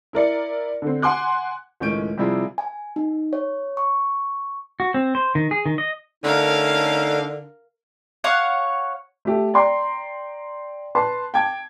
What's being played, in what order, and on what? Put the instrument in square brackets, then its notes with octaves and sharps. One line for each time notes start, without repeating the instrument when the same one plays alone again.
[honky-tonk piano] E4 A#4 D5 C#7
D3 C4
F#5 G#5 C6 D6 F#6
[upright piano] C#2 A2 D#3 C#4 G6 D7
C3 F3 G3 E4 F4 G#4
[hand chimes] G#5
D#4
C#5
C#6
[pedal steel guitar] F#4
C4
C5
D#3
G#4
D#3
D#5
[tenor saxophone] D3 [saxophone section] A3 C#4 [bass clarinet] D#4 [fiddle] A#4 F5
[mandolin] C#5 F5 F#5 C#6
[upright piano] A3 G4 A4
D5 G5 A#5 C6
B4 A5 C6
G5 A5 D6 G#6